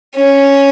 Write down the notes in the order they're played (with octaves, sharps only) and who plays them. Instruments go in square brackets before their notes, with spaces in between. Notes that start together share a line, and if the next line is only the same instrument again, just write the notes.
[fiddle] C#4